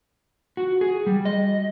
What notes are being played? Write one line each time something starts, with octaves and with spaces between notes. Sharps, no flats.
F#4
G#4
G3
D#5